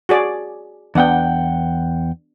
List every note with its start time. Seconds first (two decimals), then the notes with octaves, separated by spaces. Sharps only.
0.09 F#4 G#4 D5
0.95 E2 B3 D4 F#5 G5